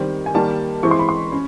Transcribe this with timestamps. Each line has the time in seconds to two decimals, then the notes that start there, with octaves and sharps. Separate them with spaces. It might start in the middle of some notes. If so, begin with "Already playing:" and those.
Already playing: D#3 G3 C4
0.26 G#5
0.34 D#3 G3 A#3 A5
0.83 E3 G#3 C4 E4 C#6
0.91 C6
0.99 B5
1.09 C6
1.32 C#4